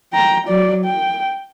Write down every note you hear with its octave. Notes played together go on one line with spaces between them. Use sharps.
G5 A#5
F#3 D5
G5